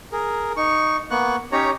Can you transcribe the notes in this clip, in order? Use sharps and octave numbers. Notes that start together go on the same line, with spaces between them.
G#4 A#4
D#4 C#6
A#3 B3 C#6 F#6
C#4 D#4 G4 C#5 A#5